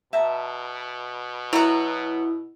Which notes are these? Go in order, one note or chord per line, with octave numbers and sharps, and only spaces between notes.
B2 E5 A5 A#5
F#3 B3 E4 A#5